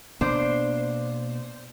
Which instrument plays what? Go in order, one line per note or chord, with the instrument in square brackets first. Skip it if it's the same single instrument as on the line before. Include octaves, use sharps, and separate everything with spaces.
[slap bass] B2 A#3 B3 [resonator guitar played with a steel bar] D4 C5